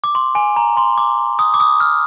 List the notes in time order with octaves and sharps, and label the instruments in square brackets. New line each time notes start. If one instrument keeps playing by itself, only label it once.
[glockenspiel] D6
C6
G#5
A#5
C6
D6
D#6
D6
D#6
F6